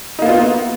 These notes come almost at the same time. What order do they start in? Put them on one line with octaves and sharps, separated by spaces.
D#4 A#3 B3 F4